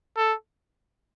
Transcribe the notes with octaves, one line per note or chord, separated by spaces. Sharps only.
A4